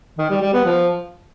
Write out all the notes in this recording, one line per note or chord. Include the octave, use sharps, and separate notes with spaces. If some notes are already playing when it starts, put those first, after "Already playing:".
D#3
G3
G3
B3
F3